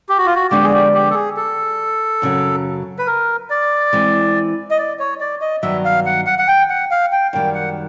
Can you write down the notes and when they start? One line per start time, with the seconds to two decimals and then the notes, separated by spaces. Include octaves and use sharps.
0.09 G4
0.18 F#4
0.26 F4
0.35 F#4
0.51 D3 F3 G#3 B3 D4 G4
0.63 G#4
0.73 G4
0.94 G4
1.10 A4
1.15 G#4
1.36 A4
2.22 F#2 C#3 F#3
2.98 B4
3.07 A#4
3.50 D5
3.93 E3 G#3 C4
4.71 D#5
4.78 D5
4.99 C#5
5.20 D5
5.41 D#5
5.62 G2 D#3 F#3 B3 E5
5.85 F5
6.06 F#5
6.26 F#5
6.39 F#5
6.48 G5
6.70 F#5
6.91 F5
7.12 G5
7.33 F#2 D#3 G3 G5
7.55 F#5